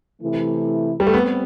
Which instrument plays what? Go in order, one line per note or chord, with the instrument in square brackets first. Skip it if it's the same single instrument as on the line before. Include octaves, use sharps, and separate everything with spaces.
[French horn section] C3 E3 A3 E4
[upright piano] G3
A3
[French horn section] G3 C4 [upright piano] B3